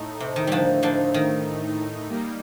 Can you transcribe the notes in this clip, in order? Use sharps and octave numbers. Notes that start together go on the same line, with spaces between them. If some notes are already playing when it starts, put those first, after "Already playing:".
Already playing: A2 A3 D#4
C3
D#3
D3 F3 G3
D3 F3
D#3
G3 A#3 D#4